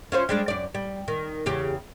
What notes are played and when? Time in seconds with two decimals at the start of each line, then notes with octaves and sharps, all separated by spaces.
0.12 C#4 F4 C5
0.29 G3 G#3 D4
0.48 F#2 D5
0.75 G3
1.08 D#3
1.46 E2 C#3 G4